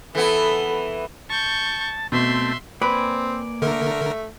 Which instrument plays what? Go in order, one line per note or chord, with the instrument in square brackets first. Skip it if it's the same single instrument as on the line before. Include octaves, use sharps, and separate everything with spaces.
[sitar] E3 B3 [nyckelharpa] A4
[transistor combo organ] A5 [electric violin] C#6 G6
[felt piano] B2 [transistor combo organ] A3 C4 [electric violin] E5 C6
[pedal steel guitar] A#3 D5 G#5 [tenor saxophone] C4 [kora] B4
[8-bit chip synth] D3 A#4 [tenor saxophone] A3